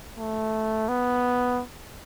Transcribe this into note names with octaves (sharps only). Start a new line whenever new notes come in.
A3
B3